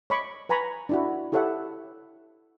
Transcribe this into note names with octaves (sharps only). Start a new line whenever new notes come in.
C#5 D#5 B5 C#6 D6
B4 G#5 A#5 B5 C#6
D4 E4 F#4
E4 G4 A4 C#5 E5 F#5